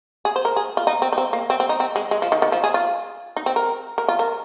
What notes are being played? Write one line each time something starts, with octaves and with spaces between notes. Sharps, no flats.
G#4
C5
A#4
G#4
F4
D#4
C4
D#4
C4
A#3
C4
C4
D#4
C4
G#3
G#3
F3
D#3
D#3
F3
G#4
F4
D#4
C4
A#4
A#4
F4
A#4